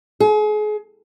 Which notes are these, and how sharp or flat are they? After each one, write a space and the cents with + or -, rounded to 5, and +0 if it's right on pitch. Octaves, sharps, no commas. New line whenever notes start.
G#4 +35